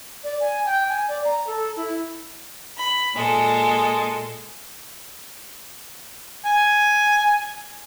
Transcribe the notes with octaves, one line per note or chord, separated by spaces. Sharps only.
D5
G#5
G5
G#5
D5
A#5
A4
E4
B5
A#2 G#3 A4
G#5